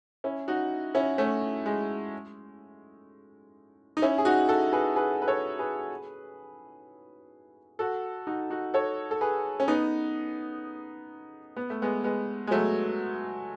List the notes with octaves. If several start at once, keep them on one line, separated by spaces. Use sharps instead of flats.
C#4 E4
D#4 F#4
C#4 E4
A3 C#4
G#3
D#4
C#4 E4
G#4
D#4 F#4
F#4 A4
G#4 B4
G#4 B4
B4
A4 C#5
G#4 B4
F#4 A4
D#4 F#4
D#4 F#4
A4 C#5
A4
G#4 B4
C#4
B3 D#4
B3
A3
G#3 B3
G#3 B3
G#3
F#3 A3